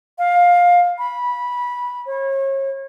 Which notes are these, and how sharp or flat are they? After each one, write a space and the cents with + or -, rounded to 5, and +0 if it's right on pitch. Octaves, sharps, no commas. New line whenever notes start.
F5 +15
B5 -15
C#5 -35